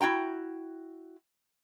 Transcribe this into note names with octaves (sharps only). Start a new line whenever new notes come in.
E4 F#4 G5 A#5